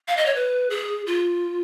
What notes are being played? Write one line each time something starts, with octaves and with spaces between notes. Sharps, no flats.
F5
D#5
C#5
B4
G#4
F4